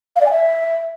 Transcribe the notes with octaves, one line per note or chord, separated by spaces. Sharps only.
F5
D5
G#5
E5